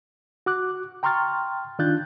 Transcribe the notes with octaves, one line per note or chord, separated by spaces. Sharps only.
F#4 D6 F#6
G5 A#5 C6 C#6 F6 A6
D#3 D4 F4 F#6 G6 A6